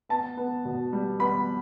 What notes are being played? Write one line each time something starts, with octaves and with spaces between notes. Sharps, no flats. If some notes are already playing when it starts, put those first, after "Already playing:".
B3 A5
B3
B2
G3
B3 B5